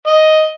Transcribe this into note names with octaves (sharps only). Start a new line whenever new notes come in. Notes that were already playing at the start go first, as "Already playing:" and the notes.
D#5